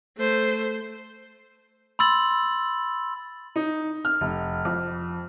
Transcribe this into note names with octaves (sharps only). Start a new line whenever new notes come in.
A3 C5
B5 C6 E6 A6 F#7
D#4
F6
F1
F2